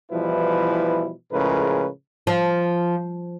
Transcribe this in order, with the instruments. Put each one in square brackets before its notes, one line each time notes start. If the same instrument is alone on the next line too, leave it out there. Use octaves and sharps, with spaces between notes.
[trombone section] B2 E3 F3 G3 E4 B4
A2 C#3 F3 G#3 A#4 B4
[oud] F3